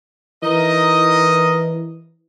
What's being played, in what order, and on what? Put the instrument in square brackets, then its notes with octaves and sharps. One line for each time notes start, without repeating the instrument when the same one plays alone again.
[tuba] E3 [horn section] D#4 A#4 D#5